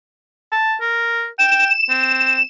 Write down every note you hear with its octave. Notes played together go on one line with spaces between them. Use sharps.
A5
A#4
G5 E7
C4